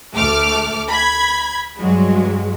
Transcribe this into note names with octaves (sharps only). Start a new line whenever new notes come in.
D2 A3 A4 D6 F6
B5 G#6
G2 F#3 G#3